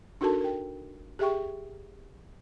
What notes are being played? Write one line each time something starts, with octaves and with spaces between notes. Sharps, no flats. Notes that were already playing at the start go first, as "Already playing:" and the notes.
D4 D#4 F#4 A4 A#4 A5
A#4 G5
G4 G#4 E5 G5 C#6